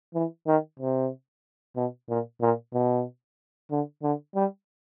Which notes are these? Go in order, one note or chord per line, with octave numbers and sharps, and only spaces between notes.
E3
D#3
C3
B2
A#2
A#2
B2
D3
D3
G3